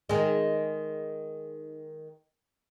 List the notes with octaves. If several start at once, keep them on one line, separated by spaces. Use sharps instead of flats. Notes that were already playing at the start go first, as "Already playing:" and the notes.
D#3 G#3